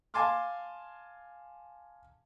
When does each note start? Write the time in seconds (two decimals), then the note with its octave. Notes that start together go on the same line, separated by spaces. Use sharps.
0.14 F5 G#5 A5 C6 D6 F6